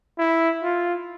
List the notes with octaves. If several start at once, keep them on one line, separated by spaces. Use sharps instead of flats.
E4
F4